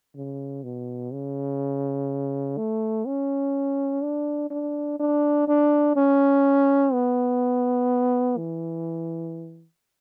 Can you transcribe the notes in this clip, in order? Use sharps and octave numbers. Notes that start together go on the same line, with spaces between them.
C#3
B2
C#3
A3
C#4
D4
D4
D4
D4
C#4
B3
E3